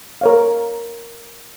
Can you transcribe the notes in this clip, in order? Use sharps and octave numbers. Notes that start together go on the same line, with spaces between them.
A#4 C#5 F5